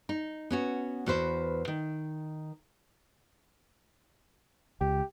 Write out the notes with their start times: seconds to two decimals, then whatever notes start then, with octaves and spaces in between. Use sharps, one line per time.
0.09 D#4
0.50 B3 C#4 F#4
1.07 E2 F#4 B4 C5
1.68 D#3
4.81 C#2 G4